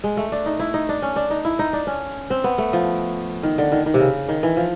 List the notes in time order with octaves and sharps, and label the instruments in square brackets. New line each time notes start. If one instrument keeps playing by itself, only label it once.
[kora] G#3
A3
D4
D#4
E4
D#4
D4
C#4
D4
D#4
E4
D#4
D4
C#4
C4
B3
A3
F3
D#3
D3
D#3
D#3
C3
C#3
D#3
E3
F3